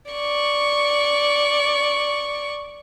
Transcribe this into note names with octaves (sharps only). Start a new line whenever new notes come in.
D5 C#6